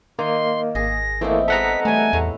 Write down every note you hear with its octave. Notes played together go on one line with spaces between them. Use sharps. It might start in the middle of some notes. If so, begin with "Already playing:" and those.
D#3 A#3 C6
G#1 G#4 A#6
E3 A3 A#3 C4 D#4 E4
G#3 B3 F4 A4 F#5 A#5 B6
E3 G3 A3 G#5
E2 A2